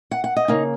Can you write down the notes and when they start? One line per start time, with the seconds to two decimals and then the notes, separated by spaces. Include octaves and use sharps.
0.11 F#5
0.24 F#5
0.36 D#5
0.48 C#3 A#3 D#4